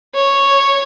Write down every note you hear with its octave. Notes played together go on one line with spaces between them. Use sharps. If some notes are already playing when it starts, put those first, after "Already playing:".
C#5